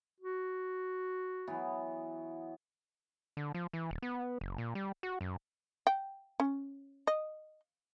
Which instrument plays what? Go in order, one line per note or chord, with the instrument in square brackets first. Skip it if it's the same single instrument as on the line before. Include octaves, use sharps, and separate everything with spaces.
[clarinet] F#4
[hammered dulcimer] E3 F#3 B3
[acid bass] D3
F3
E3
D#1
B3
F#1
A#2
G3
F#4
F#2
[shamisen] G5
C#4
D#5